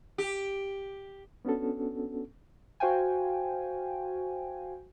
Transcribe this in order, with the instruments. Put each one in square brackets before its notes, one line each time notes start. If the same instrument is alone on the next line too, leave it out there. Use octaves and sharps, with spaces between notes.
[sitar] G4
[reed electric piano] B3 C#4 D4 F#4 A4
[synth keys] F#4 C5 F5 G5 G#5